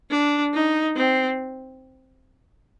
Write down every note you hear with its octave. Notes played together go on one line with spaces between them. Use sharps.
D4
D#4
C4